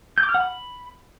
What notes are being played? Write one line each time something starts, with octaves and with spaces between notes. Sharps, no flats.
G6
D6
F6
F#5
B5